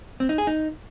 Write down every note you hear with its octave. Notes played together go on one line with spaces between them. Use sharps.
C4
D#4
G#4
D#4